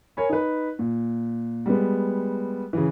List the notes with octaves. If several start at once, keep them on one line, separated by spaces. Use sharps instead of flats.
A#4 C#5 G#5 B5
D#4 B4
A#2
G3 G#3 B3
C#3 E3